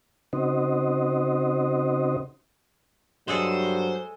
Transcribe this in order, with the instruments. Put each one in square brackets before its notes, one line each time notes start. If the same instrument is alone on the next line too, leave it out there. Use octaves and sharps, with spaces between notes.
[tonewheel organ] C#3 C4 D#4 F#4 C5 D#5
[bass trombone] G2 [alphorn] F#3 [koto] G#3 G#4 A4 [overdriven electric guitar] C5